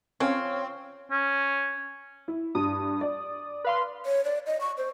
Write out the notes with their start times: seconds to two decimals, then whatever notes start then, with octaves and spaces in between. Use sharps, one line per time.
0.20 F3 C4 C#4 C#5 F5 G#5
1.11 C#4
2.28 E4
2.55 G2 D#6
3.01 D5
3.64 B4 F5 C6
4.06 C#5
4.25 D5
4.47 D#5
4.61 C#6
4.78 C5